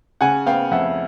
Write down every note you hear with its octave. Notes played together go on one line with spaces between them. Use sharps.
C#3 F#5 G#5
B3 F5 G5
F2 E5 F#5